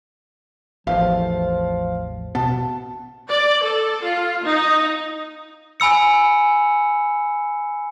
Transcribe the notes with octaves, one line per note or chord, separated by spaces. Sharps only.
A1 E2 F3 F5
B2 B3 A5
D5
A4
F4
D#4
G#5 B5 E6 C#7